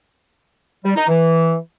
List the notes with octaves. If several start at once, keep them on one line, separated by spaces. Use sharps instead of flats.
G3
D#4
E3